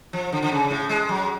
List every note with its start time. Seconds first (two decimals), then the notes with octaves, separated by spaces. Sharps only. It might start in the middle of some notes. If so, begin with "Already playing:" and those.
0.13 F3
0.32 D3
0.42 D3
0.52 C#3
0.71 A2
0.89 G#3
1.09 F#3